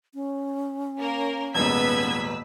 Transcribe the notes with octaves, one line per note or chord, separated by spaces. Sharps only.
C#4
A#3 A#4
D#1 G#2 B3 B4 E6 G#6 B6